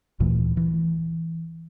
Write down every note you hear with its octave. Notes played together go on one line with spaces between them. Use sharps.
D2 A#2 E3 A3
E3